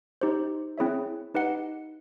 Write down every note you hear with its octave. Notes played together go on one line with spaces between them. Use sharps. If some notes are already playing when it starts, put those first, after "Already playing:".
D#4 G4 C5
C4 E4 G#4 C#5 E5
D#4 G4 B4 D#5 F#5